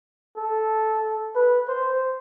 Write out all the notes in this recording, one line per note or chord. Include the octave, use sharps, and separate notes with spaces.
A4
B4
C5